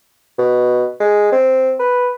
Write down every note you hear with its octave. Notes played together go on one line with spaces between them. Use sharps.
B2
G#3
C4
B4